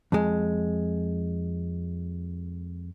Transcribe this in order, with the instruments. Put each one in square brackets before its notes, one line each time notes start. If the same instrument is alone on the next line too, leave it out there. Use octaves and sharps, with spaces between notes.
[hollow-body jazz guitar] F2 G#3